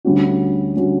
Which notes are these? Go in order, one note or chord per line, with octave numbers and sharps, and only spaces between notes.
D2 D3 G3 C#4 F#4
D3 G3 C#4 F#4